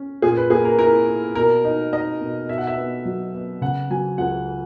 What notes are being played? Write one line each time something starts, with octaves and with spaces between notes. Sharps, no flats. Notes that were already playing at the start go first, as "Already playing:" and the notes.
Already playing: C#4
A#2 G#4
B4
A#3 G#4
A#4
E4 A#4
E4
B2 A#4
D#4
D#4 D#5
B2
B2 E5
F#5
E5
B3
F#3
B3
C#3 F#5
F#3 G#5
C#2 F#5